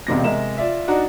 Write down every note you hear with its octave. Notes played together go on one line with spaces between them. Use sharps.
E1 C#2 C3 A#6
C3 G#3 A#4 E5 A#5 E7
F4 D5 E5
D4 D#4 F#4 D5 A#5